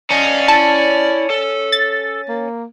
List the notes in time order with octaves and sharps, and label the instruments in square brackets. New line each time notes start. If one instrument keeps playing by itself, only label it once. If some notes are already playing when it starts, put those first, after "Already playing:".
[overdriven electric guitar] C#4 [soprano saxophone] D5 [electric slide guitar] D#5 F5 A5
[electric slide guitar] E4 [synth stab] A5
[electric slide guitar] A4
[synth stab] A6
[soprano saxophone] A#3